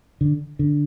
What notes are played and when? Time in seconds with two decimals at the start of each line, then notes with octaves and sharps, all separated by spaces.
0.21 D3
0.59 D3